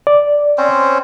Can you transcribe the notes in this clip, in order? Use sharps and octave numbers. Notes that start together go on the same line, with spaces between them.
D5
C4 C#4 C5